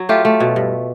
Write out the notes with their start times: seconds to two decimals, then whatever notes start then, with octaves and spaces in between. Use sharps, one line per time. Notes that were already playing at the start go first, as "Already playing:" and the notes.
Already playing: F#3
0.09 A3 F4 G4
0.25 A3
0.40 B2
0.56 G2